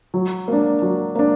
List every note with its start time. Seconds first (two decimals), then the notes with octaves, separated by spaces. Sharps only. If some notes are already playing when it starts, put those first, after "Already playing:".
0.14 F#3
0.48 A#3 D4
0.82 F#3
1.15 A#3 D4